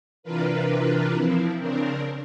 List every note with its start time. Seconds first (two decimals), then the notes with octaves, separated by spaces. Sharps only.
0.23 C3 E3 D4 F4 A#4 B4
1.14 F3 C4 E4
1.58 C#3 C4 D4 A#4